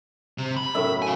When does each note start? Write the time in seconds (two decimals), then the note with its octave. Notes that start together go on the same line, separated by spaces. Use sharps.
0.38 C3
0.57 B5
0.75 F#2 A2 E5
1.02 F5 G#5